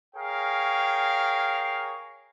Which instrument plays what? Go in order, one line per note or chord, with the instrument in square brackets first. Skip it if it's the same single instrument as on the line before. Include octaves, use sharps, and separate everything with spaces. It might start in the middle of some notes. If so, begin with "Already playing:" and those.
[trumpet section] G#4 A#4 C#5 F5 G5